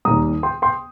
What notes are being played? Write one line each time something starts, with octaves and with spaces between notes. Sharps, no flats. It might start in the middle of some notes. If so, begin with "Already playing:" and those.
D#2 D#3 G3 A#5 D#6
G5 C6
G5 C6